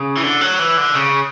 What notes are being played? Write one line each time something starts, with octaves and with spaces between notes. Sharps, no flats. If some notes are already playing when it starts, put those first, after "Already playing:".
Already playing: C#3
E3
D3
F#3
E3
D3
C#3